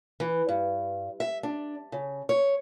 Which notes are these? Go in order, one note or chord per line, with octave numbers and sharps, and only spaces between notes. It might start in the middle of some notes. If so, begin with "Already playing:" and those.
E3
G2
E5
D4
C#3
C#5